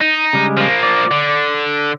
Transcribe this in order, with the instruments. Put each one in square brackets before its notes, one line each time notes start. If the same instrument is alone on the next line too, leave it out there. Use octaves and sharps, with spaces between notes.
[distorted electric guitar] D#4
[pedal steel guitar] C#3 G3 G#3
[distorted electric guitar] F3 A#3
[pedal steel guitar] D5
[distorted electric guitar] D3